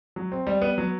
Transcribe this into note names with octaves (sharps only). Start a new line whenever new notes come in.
F#3
C4
G3
B3
F#3